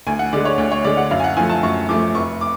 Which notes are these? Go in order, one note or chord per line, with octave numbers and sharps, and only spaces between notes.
D2 G#5
F#5
D3 G#3 D5
C#5
D2
C#5
D3 G#3 D5
F#5
F#2 F5
G#5
F#5
F3 A3 G#5
A5
F#2 C#6
F3 A3 D6
F1 C#6
D6